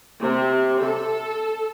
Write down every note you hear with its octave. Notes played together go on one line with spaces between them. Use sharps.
C3
A4